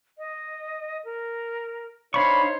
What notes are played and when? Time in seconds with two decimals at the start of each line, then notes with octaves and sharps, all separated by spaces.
0.18 D#5
1.05 A#4
2.14 D4 D#4 C5 C#5 F5 B5 C#6